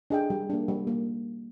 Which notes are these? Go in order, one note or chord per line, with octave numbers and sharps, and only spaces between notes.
D4 G#4 D#5 G5
G3
A#3 D4
G3
A#3